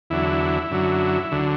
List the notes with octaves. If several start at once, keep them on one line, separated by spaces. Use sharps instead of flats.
E2 D3 F#3 E4
F#2 D3 F#3
D2 D3 F#3